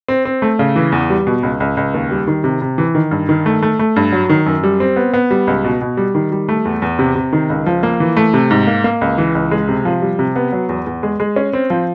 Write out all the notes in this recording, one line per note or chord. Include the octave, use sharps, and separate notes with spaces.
C4
C4
A3
C#3
E3
E2
G3
B2
C#2
C#2
C#2
D#2
G3
D#3
C3
C3
E3
D#3
G2
D#3
A3
A3
A3
G2
F#3
D#3
F#2
G3
C4
B3
B3
G3
C#2
B2
B2
G3
D#3
G3
A3
E2
E2
C3
C3
D#3
C#2
F3
A#3
E3
A3
C3
G#2
A#3
A#3
C#2
E3
C#2
G#3
C3
F3
G3
C3
B3
F#3
E2
E2
G#3
G#3
C#4
C4
F3